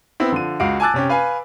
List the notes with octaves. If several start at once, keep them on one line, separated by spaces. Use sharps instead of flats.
B3 C4 E4
D3 F3 D#7
C#2 F#4 F5 D7
G#5 A5 D6 E6 F#6 A6
C3 C#4 G4
B4 F5 G#5